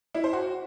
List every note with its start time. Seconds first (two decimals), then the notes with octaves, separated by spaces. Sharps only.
0.14 E4
0.24 C5
0.33 F#4